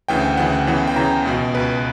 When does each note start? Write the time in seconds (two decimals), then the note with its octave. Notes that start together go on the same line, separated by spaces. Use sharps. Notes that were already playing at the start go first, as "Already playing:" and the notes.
0.08 D2 C#3 E3 G5
0.37 D2 C#3 E3 F#5
0.67 E2 C#3 E3
0.87 G5
0.96 E2 C#3 E3 A#5
1.25 C#2 B2
1.54 C#2 B2 B4